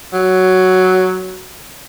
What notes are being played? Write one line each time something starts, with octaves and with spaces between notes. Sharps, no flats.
F#3